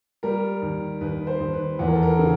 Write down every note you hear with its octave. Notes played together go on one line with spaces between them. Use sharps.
G3 A#4
D#2
D#2 B4
C5
D#2
B4
E2 B4
A#4
A4
A#4
C#3